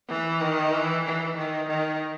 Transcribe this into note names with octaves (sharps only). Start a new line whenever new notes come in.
E3
D#3
E3
E3
D#3
D#3